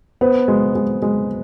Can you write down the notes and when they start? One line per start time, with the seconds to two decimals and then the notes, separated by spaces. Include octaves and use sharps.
0.21 B3 C5
0.48 G#3
0.75 G#3
1.02 G#3